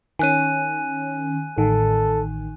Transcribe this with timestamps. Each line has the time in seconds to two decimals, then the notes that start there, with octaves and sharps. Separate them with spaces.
0.19 D#3 C#4 G#5 F#6 D#7
1.58 A1 D#3 A4